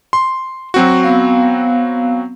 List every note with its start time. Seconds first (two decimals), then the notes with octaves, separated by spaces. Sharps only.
0.13 C6
0.74 F#3 C4 F#4
1.04 B3 F5